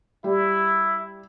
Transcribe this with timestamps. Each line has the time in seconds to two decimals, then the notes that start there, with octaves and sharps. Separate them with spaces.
0.24 G3 E4